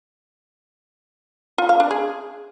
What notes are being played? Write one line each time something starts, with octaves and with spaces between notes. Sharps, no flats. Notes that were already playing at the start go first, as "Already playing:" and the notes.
F4
F5
D4
G#4